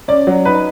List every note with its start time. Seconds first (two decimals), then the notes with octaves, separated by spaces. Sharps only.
0.08 C#4 D5
0.27 F#3
0.45 D#4 B4